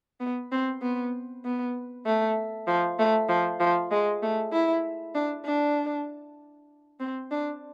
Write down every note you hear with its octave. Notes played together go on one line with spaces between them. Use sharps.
B3
C4
B3
B3
A3
F3
A3
F3
F3
G#3
A3
E4
D4
D4
C4
D4